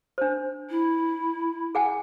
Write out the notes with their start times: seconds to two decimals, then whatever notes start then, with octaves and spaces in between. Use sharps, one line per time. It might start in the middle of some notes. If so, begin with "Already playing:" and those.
0.18 D4 C5
0.70 E4
1.75 G#4 F#5 G#5